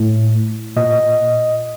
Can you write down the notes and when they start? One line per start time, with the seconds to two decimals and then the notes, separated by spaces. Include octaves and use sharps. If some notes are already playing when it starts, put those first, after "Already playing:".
Already playing: A2
0.76 A#2 D#5